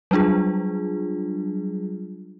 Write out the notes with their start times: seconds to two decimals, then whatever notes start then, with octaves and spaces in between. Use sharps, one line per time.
0.11 F#3 G3 D4 F4 G#4